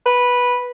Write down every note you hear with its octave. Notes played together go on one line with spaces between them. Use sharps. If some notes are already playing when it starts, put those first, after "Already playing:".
B4